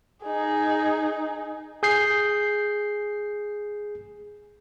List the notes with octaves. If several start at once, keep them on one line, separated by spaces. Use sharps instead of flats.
D#4 G#4
G#4 G6 C7